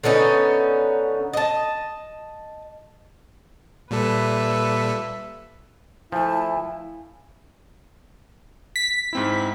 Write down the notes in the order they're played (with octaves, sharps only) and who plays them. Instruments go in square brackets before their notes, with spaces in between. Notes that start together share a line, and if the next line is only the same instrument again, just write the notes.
[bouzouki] D3 B3 C#4 D#4
D#5 A5
[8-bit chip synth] A#2 G3 A4 [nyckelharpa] B4 E5
[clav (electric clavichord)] F3 A3 [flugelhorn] E4 [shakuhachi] G#5 [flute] A5
[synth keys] B6
[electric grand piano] G#2 C4 E4